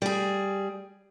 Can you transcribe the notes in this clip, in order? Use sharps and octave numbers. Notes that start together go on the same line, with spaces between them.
G3 G#4